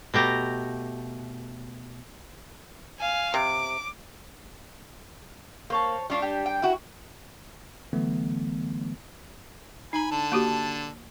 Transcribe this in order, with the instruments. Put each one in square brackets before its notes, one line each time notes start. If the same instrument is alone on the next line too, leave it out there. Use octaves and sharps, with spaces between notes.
[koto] B2 A3 G4 A#5
[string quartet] F5 G#5
[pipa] C3 [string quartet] D6
[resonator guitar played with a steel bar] A#3 [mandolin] C5 C#5 A5
[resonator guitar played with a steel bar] G3 D4 [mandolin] C#4 F4 C#6
[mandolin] G4
G5
[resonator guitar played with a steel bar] E4 F#4
[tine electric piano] D3 E3 F#3 A3 B3
[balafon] D#4 A#5 [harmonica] G#5 B5
[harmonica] D3 A5
[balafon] A#3 F#4 G4